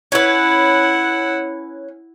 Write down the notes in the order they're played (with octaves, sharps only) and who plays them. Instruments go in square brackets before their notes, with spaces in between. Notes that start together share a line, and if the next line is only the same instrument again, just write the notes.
[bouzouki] C#4 B4 [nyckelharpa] E4 F#5